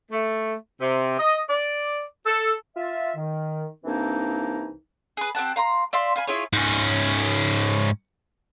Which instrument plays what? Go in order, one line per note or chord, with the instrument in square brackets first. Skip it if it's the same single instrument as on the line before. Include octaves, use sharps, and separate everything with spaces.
[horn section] A3
C3
D#5
D5
A4
[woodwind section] F4 E5
D#3
C2 E3 A#3 C4 D4 D#4
[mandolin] G#4 B4
C4 G4 F#5 A5
F5 A#5 C6
D5 E5 F5 C6
F4 G#5 B5
E4 F4 G#4 C#5
[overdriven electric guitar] G#2 C#4